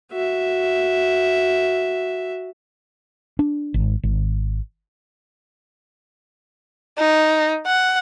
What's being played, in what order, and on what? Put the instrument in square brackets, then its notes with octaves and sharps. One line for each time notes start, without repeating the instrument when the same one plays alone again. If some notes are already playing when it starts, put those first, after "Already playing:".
[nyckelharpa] F#4 E5
[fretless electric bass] D4
G#1
G#1
[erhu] D#4
F#5